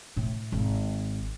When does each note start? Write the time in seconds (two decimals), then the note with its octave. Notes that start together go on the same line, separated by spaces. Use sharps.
0.16 A2 A3
0.52 G#1